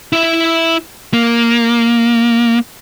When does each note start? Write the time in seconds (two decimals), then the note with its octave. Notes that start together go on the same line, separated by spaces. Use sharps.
0.13 E4 E5
1.13 A#3